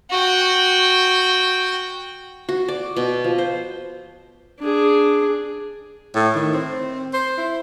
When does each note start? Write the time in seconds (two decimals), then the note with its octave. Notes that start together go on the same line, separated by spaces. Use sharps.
0.10 F#4 G5
2.49 F#4
2.68 D5
2.96 B2
3.24 F3
3.38 C5
4.59 D4 G#4
6.15 A2
6.35 D#3
6.53 C4
7.13 C5
7.38 E4